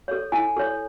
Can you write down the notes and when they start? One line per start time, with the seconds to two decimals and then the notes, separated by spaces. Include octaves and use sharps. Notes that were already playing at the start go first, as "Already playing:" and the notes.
0.08 A4 C#5
0.32 E4 G#5
0.57 A4 C#5